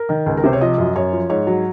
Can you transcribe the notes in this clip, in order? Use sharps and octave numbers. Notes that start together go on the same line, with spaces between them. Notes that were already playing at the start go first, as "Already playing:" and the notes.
Already playing: A#4
D#3
C#2
A#4
C3 C5
C#5
F3 D#5
F#2
F#2 C#5
F3
G#2 C#5
F#3